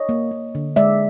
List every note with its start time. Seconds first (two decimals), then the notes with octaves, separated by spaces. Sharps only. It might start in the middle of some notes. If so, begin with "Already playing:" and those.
Already playing: C#5 D#5
0.09 A#3
0.31 A#3
0.55 D3
0.76 G#3 D5 E5